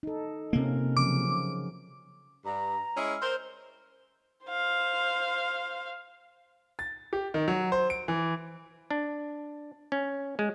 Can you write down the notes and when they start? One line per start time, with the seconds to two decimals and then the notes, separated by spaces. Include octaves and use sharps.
0.03 D#4 A4
0.53 C3 A#3 C#4 F4 A#4
0.97 C#3 F3 F#3 D6
2.45 G2 A#5
2.96 G#3 C#4 E4
3.09 F6
3.22 A#4 C5
4.45 C5 F5
6.79 A6
7.13 G4
7.34 D#3
7.48 F#3
7.72 C5
7.90 D7
8.08 E3
8.91 D4
9.92 C#4
10.39 G#3